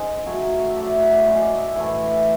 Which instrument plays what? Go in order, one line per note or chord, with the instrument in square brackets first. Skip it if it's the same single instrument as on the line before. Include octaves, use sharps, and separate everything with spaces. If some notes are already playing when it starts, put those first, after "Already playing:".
Already playing: [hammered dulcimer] G#2 C#3 G#3
C#3 F#3 A3 C#5
E5
A2 F#3 A3 D5
E5
F#5
D5
F#2 C#3 G#3 D5
D5
E5
A2 E3 A3 G#5